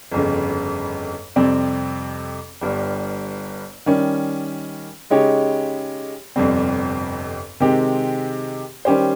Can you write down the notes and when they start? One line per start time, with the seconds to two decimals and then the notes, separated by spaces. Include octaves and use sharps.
0.12 G1 F2 C#3
1.36 F2 C3 G3 C4
2.61 G1 G2 G3
3.86 D#3 G3 C#4
5.10 C#3 G#3 D#4 G4 C#5
6.36 G1 F2 C3 G3 C4
7.60 C3 D#3 G#3 C4 G4
8.85 D#3 G3 C#4 G4 C5